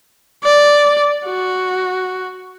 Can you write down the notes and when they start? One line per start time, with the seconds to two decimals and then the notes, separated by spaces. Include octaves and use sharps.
0.44 D5
1.25 F#4